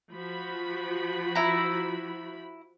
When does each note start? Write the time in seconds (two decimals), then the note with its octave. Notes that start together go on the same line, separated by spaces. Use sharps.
0.13 F3 F#4 B5
1.35 E4 A#5